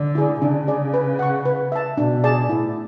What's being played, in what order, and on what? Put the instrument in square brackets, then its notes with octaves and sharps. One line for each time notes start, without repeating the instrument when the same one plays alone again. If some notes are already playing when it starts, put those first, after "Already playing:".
Already playing: [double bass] D3
[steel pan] E4 G#4
[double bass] C#3 [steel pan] D4
[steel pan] G#4 D5
B4
F#5 C#6
B4
E5 A5
[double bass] B2 [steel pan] D4
[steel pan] G#4 D5 A5
[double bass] A2 [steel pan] E4